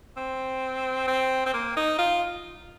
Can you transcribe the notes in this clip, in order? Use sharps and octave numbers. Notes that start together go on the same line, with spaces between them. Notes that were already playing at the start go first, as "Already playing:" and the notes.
C4
C4
C4
A#3
D#4
F4